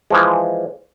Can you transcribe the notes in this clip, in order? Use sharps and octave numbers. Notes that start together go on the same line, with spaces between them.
E3 F3 G#3